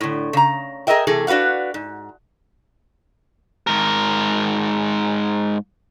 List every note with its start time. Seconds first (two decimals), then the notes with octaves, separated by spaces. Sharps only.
0.01 A2 D3
0.33 C#3 A#5
0.87 G#4 A#4 D#5 E5 G5
1.07 C3 E3 A3 G#4 A4
1.27 D4 F#4 B4 F5 F#5
1.74 G#2
3.67 G#2 A#4